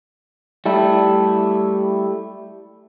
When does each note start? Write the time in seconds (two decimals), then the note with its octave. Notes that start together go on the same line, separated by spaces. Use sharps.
0.66 G3 A3 E4